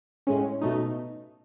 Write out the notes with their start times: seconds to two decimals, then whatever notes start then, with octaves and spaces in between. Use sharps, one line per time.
0.27 A2 G#3 C#4
0.62 B2 A3 D#4